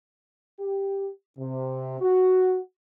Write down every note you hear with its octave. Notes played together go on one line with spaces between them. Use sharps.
G4
C3
F#4